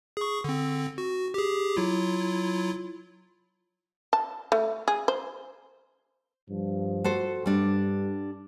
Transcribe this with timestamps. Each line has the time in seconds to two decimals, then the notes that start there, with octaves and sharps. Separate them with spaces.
0.17 G#4 C#6
0.44 D3 C4
0.98 F#4
1.34 G4 G#4
1.77 F#3 E4 F4
4.13 A5
4.52 A3
4.88 G#4
5.08 C5
6.50 G2 F3
7.04 F#4 A4 C5
7.46 G2 G3 D4